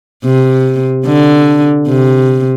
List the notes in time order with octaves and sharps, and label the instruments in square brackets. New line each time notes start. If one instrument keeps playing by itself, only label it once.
[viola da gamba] C3
D3
C3